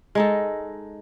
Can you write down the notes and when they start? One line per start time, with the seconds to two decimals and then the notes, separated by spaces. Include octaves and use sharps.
0.15 G#3 D#4 A4